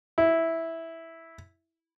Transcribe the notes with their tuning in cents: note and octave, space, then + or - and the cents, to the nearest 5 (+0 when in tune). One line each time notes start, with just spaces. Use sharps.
E4 -5